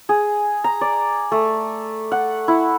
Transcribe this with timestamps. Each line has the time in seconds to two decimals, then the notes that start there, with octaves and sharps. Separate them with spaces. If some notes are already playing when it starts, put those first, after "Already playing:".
0.09 G#4
0.64 A#5
0.81 D5
1.32 A3
2.12 F#5
2.48 E4